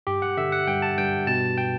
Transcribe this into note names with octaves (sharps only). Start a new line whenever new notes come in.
G2 G4
F#5
D3 E5
F#5
G2 G5
A5
G2 G5
B2 A5
G5